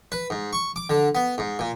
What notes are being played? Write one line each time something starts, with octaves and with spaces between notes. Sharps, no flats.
B4
G#2
C#6
D6
D3
B3
G#2
A#2